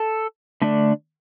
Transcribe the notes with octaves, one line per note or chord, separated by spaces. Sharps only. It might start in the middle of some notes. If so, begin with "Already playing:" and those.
Already playing: A4
D3 A3 D4